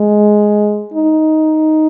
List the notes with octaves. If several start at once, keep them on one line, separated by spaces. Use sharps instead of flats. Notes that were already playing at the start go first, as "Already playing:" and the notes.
Already playing: G#3
D#4